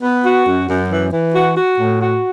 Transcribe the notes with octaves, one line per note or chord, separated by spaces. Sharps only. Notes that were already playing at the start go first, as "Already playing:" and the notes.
B3
F#4
F#2
F#2
E3
E3
F#4
F#4
A2
F#4